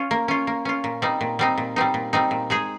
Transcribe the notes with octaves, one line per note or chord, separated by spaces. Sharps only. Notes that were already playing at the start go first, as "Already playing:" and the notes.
Already playing: C#4 F4
A#3
C#4 F4
A#3
C#4 F4
A#2
G3 C4 D#4
A#2
G3 C4 D#4
A#2
G3 C4 D#4
A#2
G3 C4 D#4
A#2
G#3 D#4 G#4